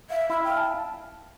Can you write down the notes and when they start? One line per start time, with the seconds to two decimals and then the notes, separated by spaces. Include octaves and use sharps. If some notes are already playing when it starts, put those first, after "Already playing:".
0.10 E5 F5
0.30 E4 E5
0.44 G5
0.50 F5
0.57 A5